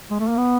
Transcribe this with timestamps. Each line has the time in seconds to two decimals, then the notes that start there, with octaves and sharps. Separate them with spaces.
0.11 G#3
0.19 A3
0.28 A#3
0.37 B3